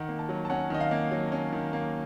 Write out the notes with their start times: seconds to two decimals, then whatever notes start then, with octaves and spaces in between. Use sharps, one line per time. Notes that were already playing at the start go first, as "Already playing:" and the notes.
Already playing: D#3 F#5
0.09 A#3
0.19 A5
0.29 F#3
0.45 A5
0.50 C#4 F#5
0.70 D#3 D#5
0.80 F5
0.91 A#3
1.11 F#3
1.32 C#4
1.52 D#3
1.73 A#3